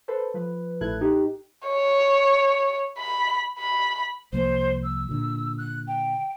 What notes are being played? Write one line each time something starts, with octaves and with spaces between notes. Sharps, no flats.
A4 B4 C5
F3 B4
A1 A2 E4 A4 F#6 G#6
D#4 G4
C#5
B5
B5
C2 F3 A#3 C5
E6
A#2 D3
F#6
G5